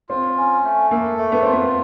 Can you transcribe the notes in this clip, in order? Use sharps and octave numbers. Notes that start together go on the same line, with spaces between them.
C4 F4
C#4
A3
A#3 A4
A3
B3
C4 F4
B3